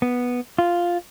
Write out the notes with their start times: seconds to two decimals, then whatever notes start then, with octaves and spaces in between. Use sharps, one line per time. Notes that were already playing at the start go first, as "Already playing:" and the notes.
0.02 B3
0.59 F4